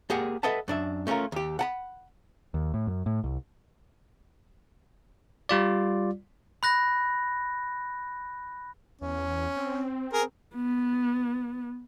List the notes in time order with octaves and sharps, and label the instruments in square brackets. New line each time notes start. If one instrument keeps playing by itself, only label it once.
[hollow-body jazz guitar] A#3 G4 G#4 F#5
A4 B4 D#5 E5 F#5 A5
F#2 D4 E5
A3 C#4 D#4 F4 A#4
D#2 G4
F#5 A5 B5
[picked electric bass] D#2
A2
F#2
A2
C2
[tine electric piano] G3 F4 D5
[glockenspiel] B5 F#6 A#6
[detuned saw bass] E2 [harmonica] C#4
[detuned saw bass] C4
[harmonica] G#4 A#4
[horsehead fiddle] B3